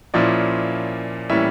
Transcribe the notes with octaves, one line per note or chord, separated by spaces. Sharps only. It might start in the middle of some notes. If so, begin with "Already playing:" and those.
A#2 F3 C#4 E4 D5
A2 E3 G3 A#3 C#4 E5